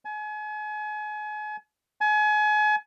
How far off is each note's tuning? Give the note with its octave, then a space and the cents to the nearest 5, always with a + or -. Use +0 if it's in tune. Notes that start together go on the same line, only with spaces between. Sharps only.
G#5 +35
G#5 +35